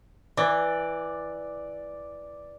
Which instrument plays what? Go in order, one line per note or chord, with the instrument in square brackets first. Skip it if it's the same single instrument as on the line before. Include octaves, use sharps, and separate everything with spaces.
[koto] E3 [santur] D5